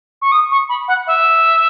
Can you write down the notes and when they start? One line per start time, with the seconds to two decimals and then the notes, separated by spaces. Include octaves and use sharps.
0.22 C#6
0.32 D#6
0.51 C#6
0.69 B5
0.88 F#5
1.07 E5